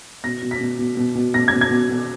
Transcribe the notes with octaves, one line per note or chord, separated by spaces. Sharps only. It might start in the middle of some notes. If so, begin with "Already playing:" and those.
B2 A#6
B2
B6
B2
B2
B2
B2
B2 A#6
B2 G#6
G#6
B2
B2